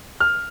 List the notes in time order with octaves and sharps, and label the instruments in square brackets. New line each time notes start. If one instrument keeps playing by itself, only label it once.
[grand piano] F6